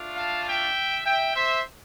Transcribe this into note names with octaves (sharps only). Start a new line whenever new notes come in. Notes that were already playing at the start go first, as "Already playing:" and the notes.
Already playing: A3 D4 F4
F5 A5
E5 G5
E5 G5
C5 E5